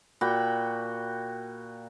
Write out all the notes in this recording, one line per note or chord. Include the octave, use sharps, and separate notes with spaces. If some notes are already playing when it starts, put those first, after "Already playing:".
A#2 F#4 G5 B5